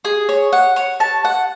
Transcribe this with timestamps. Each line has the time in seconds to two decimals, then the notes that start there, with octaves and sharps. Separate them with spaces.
0.05 G#4
0.29 C#5
0.52 F#5
0.76 C#5
1.00 A5
1.25 F#5